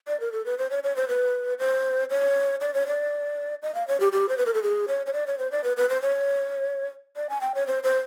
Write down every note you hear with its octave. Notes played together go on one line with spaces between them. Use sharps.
D5
A#4
A4
B4
C5
C#5
C#5
C5
B4
C5
C#5
D5
C#5
D5
D#5
F5
C#5
G4
G4
C5
B4
A#4
A4
G#4
C#5
C#5
D5
C#5
C5
D5
B4
B4
C5
C#5
D5
G#5
G5
C#5
C5
C5